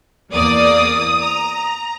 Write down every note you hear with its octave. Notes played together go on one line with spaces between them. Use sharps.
E2 A#3 D5 D#6
A#5